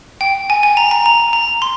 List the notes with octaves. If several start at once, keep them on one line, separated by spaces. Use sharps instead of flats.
G5
G#5
G#5
A#5
A#5
A#5
A#5
C6